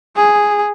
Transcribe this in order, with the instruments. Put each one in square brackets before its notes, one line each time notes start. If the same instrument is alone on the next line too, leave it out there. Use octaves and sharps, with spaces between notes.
[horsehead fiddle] G#4